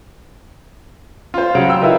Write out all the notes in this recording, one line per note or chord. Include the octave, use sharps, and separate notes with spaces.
F4 C5
C#3 F#3 F5 F#5 D7
G5 E6
E4 F4 A#4 B4 D#5